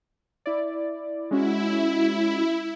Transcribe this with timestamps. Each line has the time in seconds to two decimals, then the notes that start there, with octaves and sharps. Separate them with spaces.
0.46 E4 D5
1.31 G#3 C#4 E4 F#4